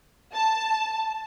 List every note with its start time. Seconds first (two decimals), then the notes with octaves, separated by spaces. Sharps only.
0.33 A5